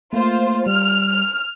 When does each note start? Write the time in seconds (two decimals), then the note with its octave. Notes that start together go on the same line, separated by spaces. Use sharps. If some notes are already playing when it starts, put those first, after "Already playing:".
0.13 A3 A#3 F4 C5
0.67 G3 F6
1.12 F6